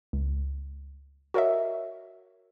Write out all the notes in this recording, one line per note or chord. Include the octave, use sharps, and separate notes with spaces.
C#2
F#4 A#4 C#5 D#5 E5